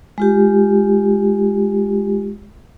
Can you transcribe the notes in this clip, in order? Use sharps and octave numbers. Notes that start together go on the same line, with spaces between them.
G#3 F4 G4